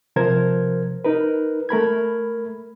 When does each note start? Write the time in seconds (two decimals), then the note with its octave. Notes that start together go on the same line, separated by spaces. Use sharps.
0.16 C3 F3 A#4 C5 G#6
1.04 D#4 A#4 B4
1.69 A3 A#4 B5 G#6